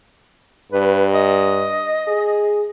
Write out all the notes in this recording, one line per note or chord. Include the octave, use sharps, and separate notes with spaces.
G2 B4
D#5
G#4